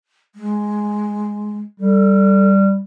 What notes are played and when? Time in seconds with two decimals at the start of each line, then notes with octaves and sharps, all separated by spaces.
0.35 G#3
1.80 G3 A4